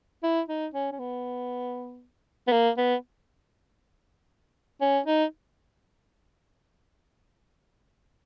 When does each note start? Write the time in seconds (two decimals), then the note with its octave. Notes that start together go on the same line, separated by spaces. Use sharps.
0.23 E4
0.49 D#4
0.74 C#4
0.92 C#4
0.99 B3
2.48 B3
2.52 A#3
2.78 B3
4.81 C#4
5.07 D#4